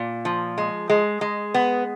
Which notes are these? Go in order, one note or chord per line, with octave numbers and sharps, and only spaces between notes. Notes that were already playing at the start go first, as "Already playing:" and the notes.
Already playing: A#2
F3
G#3
G#3
G#3
B3